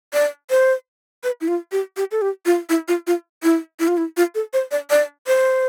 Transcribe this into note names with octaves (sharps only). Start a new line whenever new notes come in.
D5
C5
B4
E4
F4
G4
G4
A4
G4
F4
E4
F4
F4
E4
E4
F4
E4
F4
A4
C5
D5
D5
C5